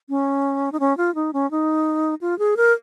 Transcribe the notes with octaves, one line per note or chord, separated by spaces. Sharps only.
C#4
D#4
C#4
F4
D#4
C#4
D#4
F4
G#4
A#4